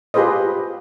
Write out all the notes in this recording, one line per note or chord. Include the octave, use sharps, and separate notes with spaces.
F4 G4 G#4 B4 C5 D#5